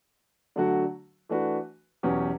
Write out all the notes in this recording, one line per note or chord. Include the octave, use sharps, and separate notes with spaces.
D3 F#3 A3 D4 F#4
E3 A3 D4 F#4 B4
E2 B2 F#3 C#4 G4